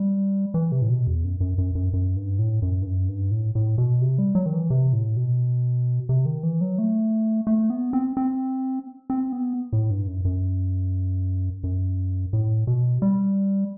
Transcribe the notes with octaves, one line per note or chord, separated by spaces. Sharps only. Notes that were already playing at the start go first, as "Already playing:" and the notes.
Already playing: G3
E3
C3
A2
B2
E2
F#2
F#2
F#2
F#2
F#2
G2
A2
F#2
G2
F#2
G2
A2
A2
B2
C3
G3
F#3
D#3
E3
C3
A2
B2
C3
D#3
E3
F#3
A3
A3
B3
C4
C4
C4
B3
A2
G2
F#2
F#2
F#2
A2
B2
G3